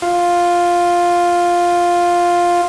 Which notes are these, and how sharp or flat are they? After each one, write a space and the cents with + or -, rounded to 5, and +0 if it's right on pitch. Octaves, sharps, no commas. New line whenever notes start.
F4 +5